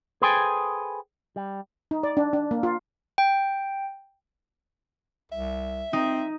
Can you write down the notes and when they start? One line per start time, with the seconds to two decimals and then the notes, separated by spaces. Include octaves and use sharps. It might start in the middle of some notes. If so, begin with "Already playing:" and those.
0.22 G#4 A4 B4 C5 G5 G#5
1.36 G3
1.91 D#4
2.03 D5
2.17 D4
2.33 D4
2.51 A#3
2.63 F4
3.18 G5
5.32 C2 E5
5.93 C4 D#4